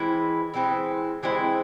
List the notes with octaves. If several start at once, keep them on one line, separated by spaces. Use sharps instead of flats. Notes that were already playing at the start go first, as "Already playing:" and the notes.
Already playing: E3 G#3 C4 E4
E3 G#3 C4 E4
E3 G#3 C4 E4